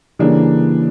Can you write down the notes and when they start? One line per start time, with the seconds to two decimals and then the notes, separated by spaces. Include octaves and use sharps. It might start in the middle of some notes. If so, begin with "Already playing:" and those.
0.19 C#3 E3 G3 A#3 D4